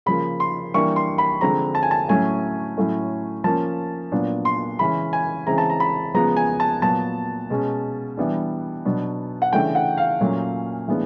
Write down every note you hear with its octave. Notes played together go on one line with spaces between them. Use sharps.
C#3 F3 A#3 B5
C6
E3 G3 A#3 D4 C#6
C6
B5
D3 F3 G#3 C4 A#5
A5
G#5
A5
A2 F#3 A3 C#4 G#5
A2 F#3 A3 C#4
F3 A#3 C#4 A5
A#2 F#3 B3 D4
C6
C#3 E3 G#3 C#4 B5
G#5
C#3 E3 G#3 C4 A#5
A5
A#5
B5
C#3 F3 G#3 B3 A#5
G#5
A5
A#2 F#3 B3 A5
B2 G#3 C#4
E3 G3 B3 D4
B2 F#3 B3 D4
F#5
C#3 E3 A3 D4 G5
F#5
F5
A#2 F#3 A3 C#4
A2 E3 G#3 B3 D4